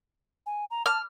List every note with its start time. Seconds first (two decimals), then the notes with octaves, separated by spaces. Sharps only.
0.46 G#5
0.71 A#5
0.86 A5 F6